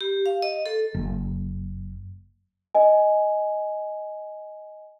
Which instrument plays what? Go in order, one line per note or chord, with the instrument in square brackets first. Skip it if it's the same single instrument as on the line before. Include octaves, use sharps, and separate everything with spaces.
[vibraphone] G4
F5
D#5
A4
[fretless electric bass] F#1
[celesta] D#5 G#5